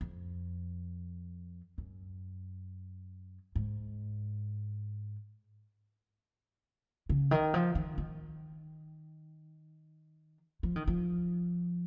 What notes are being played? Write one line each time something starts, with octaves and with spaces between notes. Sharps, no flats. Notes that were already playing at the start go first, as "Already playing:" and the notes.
F2
F#2
G#2
C#3
D#3
F3
D#3
D#3
F3
D#3
F3